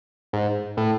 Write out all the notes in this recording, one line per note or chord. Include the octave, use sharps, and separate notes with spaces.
G#2
A2